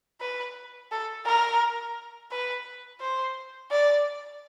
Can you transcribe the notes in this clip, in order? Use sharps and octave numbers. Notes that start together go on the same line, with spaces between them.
B4
A4
A#4
B4
C5
D5